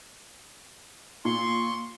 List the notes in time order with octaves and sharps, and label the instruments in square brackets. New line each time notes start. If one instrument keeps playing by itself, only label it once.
[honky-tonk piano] A#2 [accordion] C6 C#6